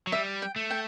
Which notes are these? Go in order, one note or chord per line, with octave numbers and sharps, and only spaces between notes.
F#3
G3 E5
G5
A3
G5